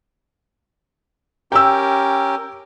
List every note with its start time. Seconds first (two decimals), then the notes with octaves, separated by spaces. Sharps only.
1.52 C#4 G4 A#4 G5 E6